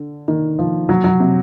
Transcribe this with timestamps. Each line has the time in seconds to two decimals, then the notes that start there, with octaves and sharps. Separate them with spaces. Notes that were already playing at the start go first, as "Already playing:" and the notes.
Already playing: D3
0.28 D#3
0.59 F3
0.89 F#3
1.04 F#3
1.20 C3